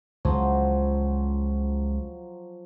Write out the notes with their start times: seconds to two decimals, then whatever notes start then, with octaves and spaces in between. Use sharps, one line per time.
0.25 C#2 F3 F#3